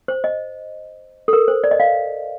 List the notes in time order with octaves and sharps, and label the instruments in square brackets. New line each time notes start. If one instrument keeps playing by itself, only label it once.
[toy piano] C5
D#5
A4
A#4
C5
D5
D#5
F5